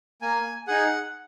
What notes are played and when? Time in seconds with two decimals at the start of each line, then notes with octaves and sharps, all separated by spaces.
0.22 A#3 G#5
0.67 D#4 G#4 F#5